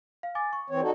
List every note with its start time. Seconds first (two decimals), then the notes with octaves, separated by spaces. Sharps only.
0.23 F5
0.35 G#5 D6 A6
0.53 C#6
0.70 E3 C4 C#5
0.81 D#4 F#4 A4 D5